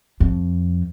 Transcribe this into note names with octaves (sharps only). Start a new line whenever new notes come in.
F2